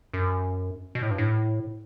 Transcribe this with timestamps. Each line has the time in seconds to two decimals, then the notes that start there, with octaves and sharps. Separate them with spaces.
0.13 F#2
0.95 B2
1.02 A2
1.11 G2
1.18 A2